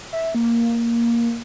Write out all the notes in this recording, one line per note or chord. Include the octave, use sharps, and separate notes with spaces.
E5
A#3